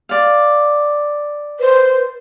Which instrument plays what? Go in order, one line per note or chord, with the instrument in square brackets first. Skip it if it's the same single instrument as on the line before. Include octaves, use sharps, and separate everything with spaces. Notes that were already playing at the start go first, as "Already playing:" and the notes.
[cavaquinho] D5 F5
[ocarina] B4 [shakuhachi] C5